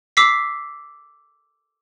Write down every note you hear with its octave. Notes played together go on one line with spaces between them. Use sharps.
D6 E6 B6 C7